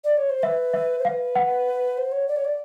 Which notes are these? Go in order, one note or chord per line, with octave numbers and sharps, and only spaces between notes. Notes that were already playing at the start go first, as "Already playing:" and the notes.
D5
C#5
C5
B4 E5
E5
C5
B4 F5
F#5
C5
C#5
D5
C#5
D5